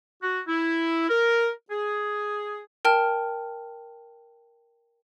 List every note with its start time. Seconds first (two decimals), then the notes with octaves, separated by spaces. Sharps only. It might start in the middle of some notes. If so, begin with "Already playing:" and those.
0.23 F#4
0.48 E4
1.09 A#4
1.71 G#4
2.85 A#4 G5 A5 F6